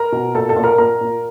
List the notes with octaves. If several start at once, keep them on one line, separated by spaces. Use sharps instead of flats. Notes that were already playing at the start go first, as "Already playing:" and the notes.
Already playing: A#4 A#5
B2
A#2 A4 A5
A4 A5
A#2
A#4 A#5
A#2 A#4 A#5
A#2